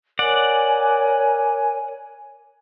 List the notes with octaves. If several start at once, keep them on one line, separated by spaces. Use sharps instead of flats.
A#4 C#5 D5 F#5 G#5